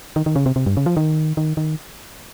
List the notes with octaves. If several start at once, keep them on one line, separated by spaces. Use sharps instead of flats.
D#3
D#3
C#3
C3
C3
G2
C#3
F3
D#3
D#3
D#3